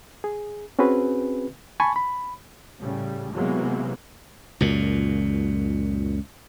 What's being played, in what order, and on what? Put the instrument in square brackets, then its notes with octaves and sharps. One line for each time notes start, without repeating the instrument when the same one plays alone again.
[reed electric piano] G#4
C4 C#4 F#4 G#4 B4
G#5 A5 B5 C#6
B5
[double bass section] A2 C#3 G3
C3 E3 F#3 G#3 A#3 B3
[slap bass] C#2 F#2 A#2